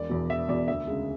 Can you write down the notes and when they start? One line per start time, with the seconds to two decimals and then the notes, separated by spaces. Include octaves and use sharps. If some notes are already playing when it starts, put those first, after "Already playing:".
Already playing: E1 D5
0.09 E2 B2
0.29 E1 E5
0.49 E2 B2 D5
0.68 D2 E5
0.87 C#3 G#3